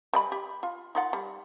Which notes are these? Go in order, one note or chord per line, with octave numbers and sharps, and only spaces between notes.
G3 D#5 B5
G4
F4
D#4 F4 F#5
G3